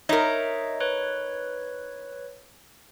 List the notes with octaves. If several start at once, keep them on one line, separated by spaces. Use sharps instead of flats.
D#4 A#4 C#5 D#5 E5
B4 C#5